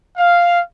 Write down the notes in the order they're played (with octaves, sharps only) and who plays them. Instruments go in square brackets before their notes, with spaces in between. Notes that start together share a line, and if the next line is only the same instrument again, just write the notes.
[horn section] F5